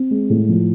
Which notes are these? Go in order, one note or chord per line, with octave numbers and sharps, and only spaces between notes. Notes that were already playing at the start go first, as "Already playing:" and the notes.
Already playing: C4
G#3
A2
F3